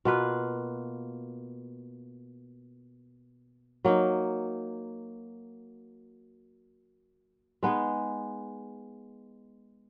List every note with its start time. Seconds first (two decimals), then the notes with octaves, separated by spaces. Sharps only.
0.05 B2 A#3 F4 B4
3.85 F#3 A#3 D#4
7.63 G#3 B3 D#4 G#4